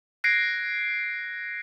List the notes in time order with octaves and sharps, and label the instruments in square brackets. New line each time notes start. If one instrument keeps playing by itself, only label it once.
[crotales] F#6 G#6 A#6 C7 D7